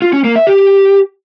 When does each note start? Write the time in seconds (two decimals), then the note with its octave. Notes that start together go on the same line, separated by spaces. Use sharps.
0.02 F4
0.13 C#4
0.24 A#3
0.36 E5
0.47 G4